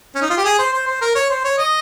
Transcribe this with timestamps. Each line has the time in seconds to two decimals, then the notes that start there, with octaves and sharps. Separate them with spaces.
0.15 C#4
0.22 D#4
0.30 F4
0.37 G4
0.45 G#4
0.59 C5
0.73 C5
0.87 C5
1.01 A#4
1.15 C#5
1.30 C5
1.44 C#5
1.59 D#5